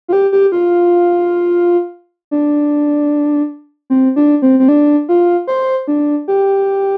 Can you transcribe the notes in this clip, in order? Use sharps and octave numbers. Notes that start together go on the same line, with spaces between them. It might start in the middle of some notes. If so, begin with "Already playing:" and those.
F4
G4
G4
F4
D4
C4
D4
C4
C4
D4
F4
C5
D4
G4